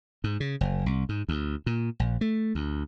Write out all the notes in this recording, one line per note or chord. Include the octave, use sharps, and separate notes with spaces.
G#2
C#3
F#1
C2
G#2
D2
A#2
A#1
A3
D2